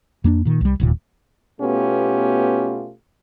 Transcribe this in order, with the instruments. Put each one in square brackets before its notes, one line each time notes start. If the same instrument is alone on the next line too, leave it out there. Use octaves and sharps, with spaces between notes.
[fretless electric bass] F2 A#3 B3 D4
A#2 D#3
C2 G3
E1 D#2 A#2
[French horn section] B2 A3 B3 C#4 F4 G4